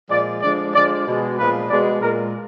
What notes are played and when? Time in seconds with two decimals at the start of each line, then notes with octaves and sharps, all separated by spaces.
0.10 A#2 F3 G#3 D5
0.41 D3 F3 G#3 D5
0.74 D3 F3 G#3 D5
1.06 B2 G#3
1.38 A#2 F3 G#3 B4
1.69 B2 G#3 D5
2.01 A#2 G#3 A#4